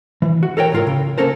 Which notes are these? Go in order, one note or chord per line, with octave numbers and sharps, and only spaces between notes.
E3
F#4
A4 A#4 C#5 G5
C#2 G#2 F4 A#4
C#3
A#3 C#4 A4 A#4 C5